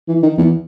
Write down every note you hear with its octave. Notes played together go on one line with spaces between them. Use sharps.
E3
D#3
E2